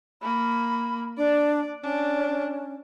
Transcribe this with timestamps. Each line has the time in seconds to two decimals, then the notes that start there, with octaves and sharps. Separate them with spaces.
0.22 A#3 B5
1.18 D4 D5
1.83 C#4 D4